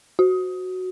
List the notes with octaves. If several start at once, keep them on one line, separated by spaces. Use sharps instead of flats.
F#4